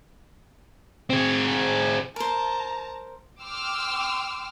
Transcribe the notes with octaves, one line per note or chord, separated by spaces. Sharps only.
C4 G#4
A#4 C5 A5 A#5
G5 C6 D6 E6 F6